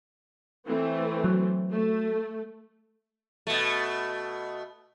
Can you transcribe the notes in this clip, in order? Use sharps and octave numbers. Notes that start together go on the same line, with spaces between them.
E3 A3 C4
F#3
A3
B2 A3